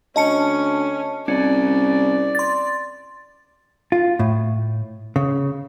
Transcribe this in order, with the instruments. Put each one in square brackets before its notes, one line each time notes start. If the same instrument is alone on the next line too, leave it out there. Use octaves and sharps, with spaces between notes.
[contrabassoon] D2 [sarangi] C#4 [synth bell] D#5 A5 C#7
[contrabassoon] C2 [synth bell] C#4 [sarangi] D5
[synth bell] C6 A6
[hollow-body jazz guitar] F4
A2
C#3